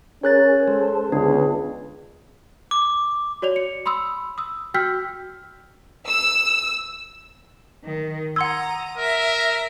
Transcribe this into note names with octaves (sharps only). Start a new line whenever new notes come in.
C#4 G#4 A#4 C#5 F#6 A6
G#3 A4 C5
C#2 D3 B3 D4 G#4
D6
F#4 C#5 D5 F7
C#7
B5 C6 D#6 E6
D#6 E6
F#4 G5 E6 F6 G6 B6
E6
D#3
F#5 A#5 C6 D#6 E6 G#6
A#4 E5